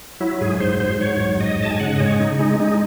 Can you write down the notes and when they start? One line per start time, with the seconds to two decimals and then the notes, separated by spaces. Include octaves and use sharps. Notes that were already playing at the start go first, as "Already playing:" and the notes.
0.20 F#3 E4
0.41 G#2 G#4
0.60 G#2 C5
0.80 G#2 C5
1.00 F#3 C#5
1.20 G#2
1.40 G#2 D#5
1.60 G#2 A5
1.71 G#5
1.80 C#3 F#5
1.96 D#5
2.00 G#3 C#5
2.20 C#3 D#4
2.39 G#3 D#4
2.60 G#3 D#4